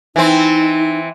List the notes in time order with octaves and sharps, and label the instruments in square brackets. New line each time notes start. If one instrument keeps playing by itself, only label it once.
[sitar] E3 C4 [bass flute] D#4